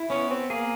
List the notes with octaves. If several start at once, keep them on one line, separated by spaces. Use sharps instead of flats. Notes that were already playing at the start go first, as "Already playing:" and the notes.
Already playing: E4
B3 C#4
C4
A#3 G#4